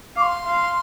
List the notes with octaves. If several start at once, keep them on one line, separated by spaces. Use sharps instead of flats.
F5 C6 D6
F5